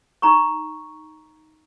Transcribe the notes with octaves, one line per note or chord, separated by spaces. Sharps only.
D#4 A#5 C#6